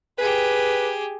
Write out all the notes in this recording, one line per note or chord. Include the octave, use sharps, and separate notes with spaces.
G4 G#4 B4